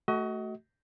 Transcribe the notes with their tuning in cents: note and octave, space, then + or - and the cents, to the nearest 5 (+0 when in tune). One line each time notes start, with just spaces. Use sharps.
A3 +0 F#4 +20 D#5 +35